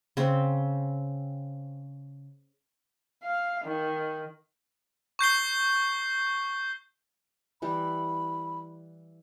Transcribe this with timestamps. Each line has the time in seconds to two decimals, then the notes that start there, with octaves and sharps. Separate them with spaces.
0.17 C#3 C4
3.24 F5
3.65 D#3
5.19 C#6 G6 C7 G7
7.62 E3 G3 B5